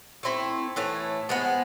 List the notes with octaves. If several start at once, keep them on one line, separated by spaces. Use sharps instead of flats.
A3 C4 E4
A2 E3 A3
F3 G#3 B3